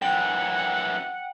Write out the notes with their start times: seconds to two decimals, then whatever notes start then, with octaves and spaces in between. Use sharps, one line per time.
0.02 F#2 E3 F#5 G5